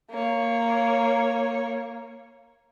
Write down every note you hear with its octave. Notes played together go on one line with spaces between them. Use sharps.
A#3 C#5